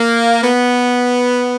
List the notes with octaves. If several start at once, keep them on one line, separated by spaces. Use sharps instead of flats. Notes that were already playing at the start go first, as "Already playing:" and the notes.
Already playing: A#3
B3